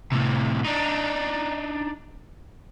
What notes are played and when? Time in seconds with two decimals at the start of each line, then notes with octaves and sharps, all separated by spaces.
0.12 A2 C3
0.65 D4 D#4